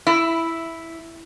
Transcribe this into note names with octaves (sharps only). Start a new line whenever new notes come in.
E4